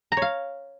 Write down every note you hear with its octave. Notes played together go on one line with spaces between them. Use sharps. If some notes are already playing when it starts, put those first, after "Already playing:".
A#5
C#5
F5